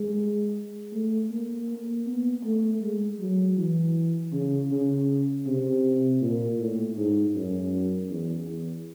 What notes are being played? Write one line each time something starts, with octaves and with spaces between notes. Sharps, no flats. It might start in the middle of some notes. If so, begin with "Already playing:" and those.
Already playing: G#3
A3
A#3
A#3
B3
A3
G#3
F#3
E3
C#3
C#3
C3
A#2
A2
G#2
F#2
E2
E2